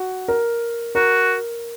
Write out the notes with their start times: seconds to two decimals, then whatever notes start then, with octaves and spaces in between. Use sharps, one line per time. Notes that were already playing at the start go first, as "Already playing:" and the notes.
Already playing: F#4
0.28 A#4
0.95 F#4 A#4